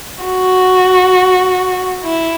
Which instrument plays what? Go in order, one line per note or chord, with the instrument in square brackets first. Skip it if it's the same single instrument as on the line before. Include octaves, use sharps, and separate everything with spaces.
[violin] F#4
E4